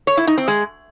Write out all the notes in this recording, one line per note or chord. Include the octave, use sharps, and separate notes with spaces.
C#5
E4
D#4
C4
G#3